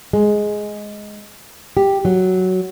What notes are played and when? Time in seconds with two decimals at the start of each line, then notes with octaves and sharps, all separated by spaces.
0.13 G#3
1.77 G4
2.05 F#3